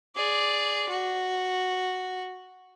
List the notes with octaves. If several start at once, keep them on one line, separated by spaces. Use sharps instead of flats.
G#4 D5
F#4